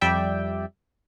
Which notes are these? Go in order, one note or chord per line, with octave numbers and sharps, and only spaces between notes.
F2 G3 D5 E5 G5